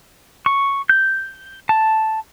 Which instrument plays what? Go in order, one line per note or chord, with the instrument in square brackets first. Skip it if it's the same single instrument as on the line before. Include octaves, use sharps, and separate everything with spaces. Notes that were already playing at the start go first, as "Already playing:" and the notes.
[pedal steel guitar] C#6
G6
A5